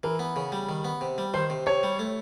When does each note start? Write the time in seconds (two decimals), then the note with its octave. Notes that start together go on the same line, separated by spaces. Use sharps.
0.03 E3 A#4
0.19 B3
0.36 C#3
0.52 G3
0.69 D#3
0.85 B3
1.01 C3
1.18 G3
1.34 D#3 C5
1.50 C3
1.66 C3 C#5
1.83 G3
1.99 A3